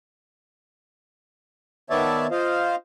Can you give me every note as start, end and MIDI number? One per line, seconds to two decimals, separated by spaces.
1.90 2.27 51
1.90 2.27 59
1.90 2.27 73
1.90 2.27 74
1.90 2.27 76
1.90 2.27 81
2.31 2.75 65
2.31 2.75 72
2.31 2.75 75
2.31 2.75 77